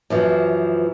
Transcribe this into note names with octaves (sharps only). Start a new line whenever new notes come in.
F#2 E3 F3